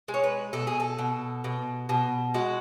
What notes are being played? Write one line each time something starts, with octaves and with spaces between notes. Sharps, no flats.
G#3
C#5
B4
B2 A4
G#4
A4
B2
B2
B2
G#3 F#4